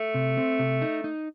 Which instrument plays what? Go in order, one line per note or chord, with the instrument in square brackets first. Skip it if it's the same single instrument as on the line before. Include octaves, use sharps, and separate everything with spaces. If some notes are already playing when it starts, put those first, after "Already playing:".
Already playing: [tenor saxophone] A3
[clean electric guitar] C3
C4
C3
D#4
D#4